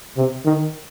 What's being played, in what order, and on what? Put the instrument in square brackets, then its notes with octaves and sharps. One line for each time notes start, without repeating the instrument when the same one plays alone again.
[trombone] C3
D#3